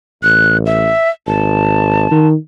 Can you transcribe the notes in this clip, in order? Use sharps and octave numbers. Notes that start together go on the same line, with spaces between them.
A1 F#6
E5
G#1 A5
D#3